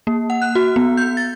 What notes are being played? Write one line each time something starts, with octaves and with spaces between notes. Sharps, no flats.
A#3
F#5
F#6
F#4
B3
G6
A6